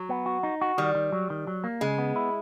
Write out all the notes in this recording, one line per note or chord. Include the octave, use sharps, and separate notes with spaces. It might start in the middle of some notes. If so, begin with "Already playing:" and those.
Already playing: F#3
B3
F#4
D#4
F#4
D#3 G3
D#3
F#3
D#3
F#3
A#3
C#3 G#3
B3
E4